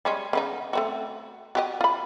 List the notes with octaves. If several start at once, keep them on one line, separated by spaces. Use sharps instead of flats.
G3 G#3 C#4
C#3 B3 D#4
A3 C4 F#4
F#4 G4 D#5
F4 B5